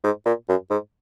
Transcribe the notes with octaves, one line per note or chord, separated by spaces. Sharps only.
G#2
A#2
F#2
G#2